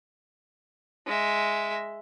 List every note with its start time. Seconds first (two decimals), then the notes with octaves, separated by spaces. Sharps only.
1.07 G#3 E5